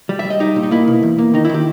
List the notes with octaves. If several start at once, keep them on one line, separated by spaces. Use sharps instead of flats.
G3
E5
G3
D#5
D#4 G4
A#2
D#4
A#3 E4
B2
E2
A#3
D#3 D#4
E4
D#3 G4